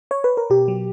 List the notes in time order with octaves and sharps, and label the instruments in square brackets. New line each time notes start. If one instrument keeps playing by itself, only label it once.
[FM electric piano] C#5
B4
A#4
B2 G4
F#3